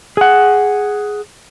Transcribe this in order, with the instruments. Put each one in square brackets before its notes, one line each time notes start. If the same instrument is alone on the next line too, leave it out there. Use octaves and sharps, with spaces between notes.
[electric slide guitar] G#4 F#5